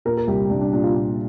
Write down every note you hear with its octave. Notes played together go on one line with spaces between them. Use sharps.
A#2 A#4
A#4
C2 G4
C2 D4
D4
A#2 D4
F4
A#2